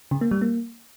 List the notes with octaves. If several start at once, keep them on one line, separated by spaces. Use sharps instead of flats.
C#3
A#3
G3
A#3